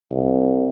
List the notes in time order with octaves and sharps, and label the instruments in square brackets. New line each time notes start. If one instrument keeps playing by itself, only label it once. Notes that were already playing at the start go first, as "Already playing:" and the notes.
[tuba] C2